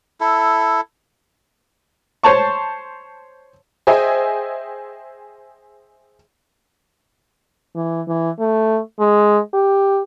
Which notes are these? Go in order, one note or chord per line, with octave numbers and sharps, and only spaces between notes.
E4 A4
C5 C#5 A5 C#6
G#4 C5 D#5 E5 G5 G#5
E3
E3
A3
G#3
G4